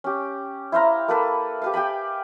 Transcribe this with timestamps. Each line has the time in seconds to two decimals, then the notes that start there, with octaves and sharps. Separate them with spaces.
0.04 C#4 G4
0.72 E4 C5 F5 A#5
1.08 A#3 A4 B4
1.62 G4 B4 F5
1.74 G4 G5 G#5 B5